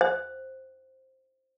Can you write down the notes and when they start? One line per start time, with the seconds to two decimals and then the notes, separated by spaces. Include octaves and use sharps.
0.01 C5